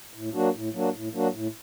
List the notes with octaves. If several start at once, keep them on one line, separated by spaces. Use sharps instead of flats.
A2
F#3 A#3 D4 F#4
A2
F#3 A#3 D4 F#4
A2
F#3 A#3 D4 F#4
A2